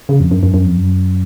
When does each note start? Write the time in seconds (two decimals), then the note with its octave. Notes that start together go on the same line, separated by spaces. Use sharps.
0.09 C#3
0.20 F2
0.31 F#2
0.43 F#2
0.54 F#2
0.65 F2
0.77 F#2